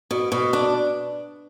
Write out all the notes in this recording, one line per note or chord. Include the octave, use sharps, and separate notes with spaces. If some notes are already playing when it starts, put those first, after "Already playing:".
B2
B2
D4